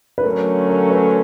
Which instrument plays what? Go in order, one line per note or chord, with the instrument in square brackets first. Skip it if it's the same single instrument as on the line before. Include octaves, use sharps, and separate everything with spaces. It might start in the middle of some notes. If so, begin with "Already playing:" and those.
[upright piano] B4
[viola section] D3 F#3 A3 C#4 [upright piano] A#4
[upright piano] A#4
B4